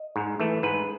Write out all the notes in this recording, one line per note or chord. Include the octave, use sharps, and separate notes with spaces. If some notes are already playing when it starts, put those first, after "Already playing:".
Already playing: D#5
G#2
E3 A3
G#2 B4